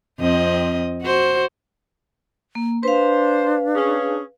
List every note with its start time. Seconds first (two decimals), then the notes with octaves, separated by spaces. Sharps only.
0.19 F2 C4 D#5
1.03 F#4 C5
2.55 A#3
2.83 D4 B4 C5 F5
3.75 C#4 G#4